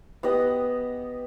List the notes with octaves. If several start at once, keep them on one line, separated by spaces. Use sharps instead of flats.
B3 G4 D#5 F#5